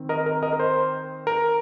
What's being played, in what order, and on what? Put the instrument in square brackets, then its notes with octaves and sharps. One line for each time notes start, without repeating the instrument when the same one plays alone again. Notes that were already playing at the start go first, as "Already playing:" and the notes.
Already playing: [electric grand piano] D#3 C4
A#4 D#5
A#4
A#4 D#5
A#4
C5
A#4